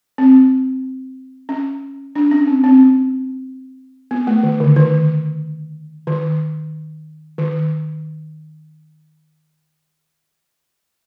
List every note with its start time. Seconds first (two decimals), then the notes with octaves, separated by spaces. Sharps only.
0.18 C4
1.49 C#4
2.16 D4
2.31 C#4
2.47 C4
2.64 C4
4.11 B3
4.27 A3
4.43 D#3
4.60 D3
4.76 D#3
6.07 D#3
7.38 D#3